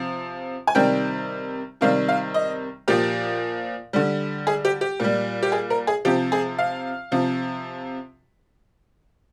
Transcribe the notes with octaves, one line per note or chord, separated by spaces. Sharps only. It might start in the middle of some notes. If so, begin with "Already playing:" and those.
Already playing: C3 F3
G#5
C3 D#3 G3 G5
C3 D#3 G3 F5
F5
D#5
A#2 F3 G4
D3 G3
G#4
G4
G4
A#2 G3
G4
G#4
A#4
G#4
C3 F3 G4
G#4
F5
C3 F3